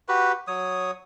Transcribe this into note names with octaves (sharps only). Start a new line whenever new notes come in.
F#4 G4 B4
F#3 C#5 D#6